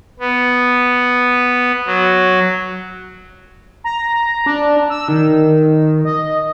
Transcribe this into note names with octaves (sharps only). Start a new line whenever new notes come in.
B3
F#3
A#5
D4
E6
D#3
D#5